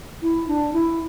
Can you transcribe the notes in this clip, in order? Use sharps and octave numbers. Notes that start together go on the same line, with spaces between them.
E4
D4
E4